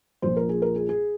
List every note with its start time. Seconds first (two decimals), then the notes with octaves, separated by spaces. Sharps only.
0.22 A#1 A#2 F3 C5
0.37 A#4
0.49 G#4
0.62 A#4
0.76 G#4
0.89 G#4